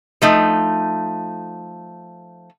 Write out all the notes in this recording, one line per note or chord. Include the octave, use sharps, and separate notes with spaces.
F3 A3 D#4